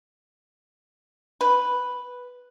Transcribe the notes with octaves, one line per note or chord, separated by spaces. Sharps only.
B4